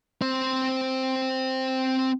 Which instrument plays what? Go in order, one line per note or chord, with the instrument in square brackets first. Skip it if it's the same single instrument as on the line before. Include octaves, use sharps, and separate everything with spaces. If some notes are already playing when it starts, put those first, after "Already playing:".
[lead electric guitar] C4 C5